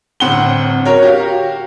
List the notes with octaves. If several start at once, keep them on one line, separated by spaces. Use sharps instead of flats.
G1 A2 C4 F#5 B5 G7
F#4 A#4 C#5
F#4 G4 F5